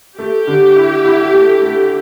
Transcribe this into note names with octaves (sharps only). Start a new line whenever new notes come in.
A3 G4
D3
E4
E4
A3
A3